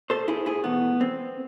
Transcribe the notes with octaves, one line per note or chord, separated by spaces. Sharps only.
A4 C5
E4 G#4
E4 G#4
E2 B2 A3 B3
C4